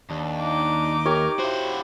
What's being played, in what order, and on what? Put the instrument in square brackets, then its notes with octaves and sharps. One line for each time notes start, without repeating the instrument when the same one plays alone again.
[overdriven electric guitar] D#2 [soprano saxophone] D4
[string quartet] D#4 D6
[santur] G4 C#5 [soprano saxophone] A#4
[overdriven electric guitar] E4 F#4 [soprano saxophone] C5